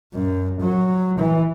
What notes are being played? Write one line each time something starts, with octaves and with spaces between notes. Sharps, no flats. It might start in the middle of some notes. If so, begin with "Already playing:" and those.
F#2
F#3
E3